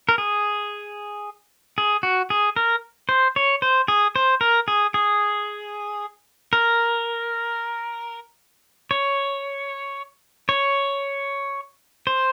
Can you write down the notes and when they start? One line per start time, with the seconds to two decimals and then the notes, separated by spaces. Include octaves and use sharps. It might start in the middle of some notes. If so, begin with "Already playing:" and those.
0.09 A#4
0.18 G#4
1.78 G#4
2.03 F#4
2.30 G#4
2.56 A#4
3.09 C5
3.36 C#5
3.62 C5
3.88 G#4
4.16 C5
4.41 A#4
4.68 G#4
4.94 G#4
6.53 A#4
8.91 C#5
10.49 C#5
12.07 C5